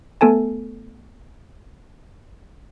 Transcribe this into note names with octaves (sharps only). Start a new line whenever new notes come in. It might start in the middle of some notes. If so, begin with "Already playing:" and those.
A3 B3 A4 G#5 A5